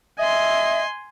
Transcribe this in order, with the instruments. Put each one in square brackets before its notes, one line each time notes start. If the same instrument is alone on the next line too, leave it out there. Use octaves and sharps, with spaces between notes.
[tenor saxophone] D#5 [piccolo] E5 [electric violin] G#5 C6